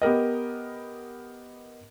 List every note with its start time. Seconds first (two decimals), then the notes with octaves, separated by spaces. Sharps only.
0.02 B3 G4 A#4 D#5